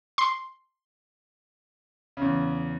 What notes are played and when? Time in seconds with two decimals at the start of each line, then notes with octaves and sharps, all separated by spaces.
0.18 C6
2.17 E2 C#3